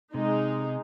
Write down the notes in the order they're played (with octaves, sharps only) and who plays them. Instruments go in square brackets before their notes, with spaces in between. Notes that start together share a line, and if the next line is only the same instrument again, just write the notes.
[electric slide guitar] C3 [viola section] G#3 D#4